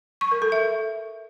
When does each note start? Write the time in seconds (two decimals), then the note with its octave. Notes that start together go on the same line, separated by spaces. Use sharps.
0.21 C#6
0.31 A#4
0.42 A4
0.52 E5